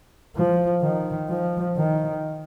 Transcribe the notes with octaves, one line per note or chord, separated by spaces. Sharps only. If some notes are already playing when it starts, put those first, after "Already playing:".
F3
D#3
F3
D#3